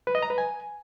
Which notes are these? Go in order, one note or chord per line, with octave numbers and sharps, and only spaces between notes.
B4
D#5
A#5
B4
G#5